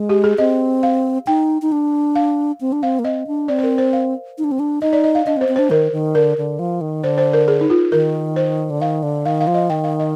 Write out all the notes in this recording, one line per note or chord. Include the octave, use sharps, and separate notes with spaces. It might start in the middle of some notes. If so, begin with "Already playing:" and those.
Already playing: G#3
G4
G#4
C4 D#5
F5
D#4 G5
D#4
D4
F5
C4
D4
C4 F5
A#3
C4 D#5
D4
C4 D5
C5
A#4
C5
F5
D#4
D4
C4
D4
D#4 D#5
D5
D#5
F5
D4 D#5
C4
C5
C4
C5
D4
D#3 A#4
D#3
D3 A#4
D3
F3
D#3
D3 C5
C5
A#4
G#4
D#4
F4
D#3 A#4
C5
D3
D#3 F5
D3
D#3 F5
F5
F3
D#5
D#3 G5
F5
D#5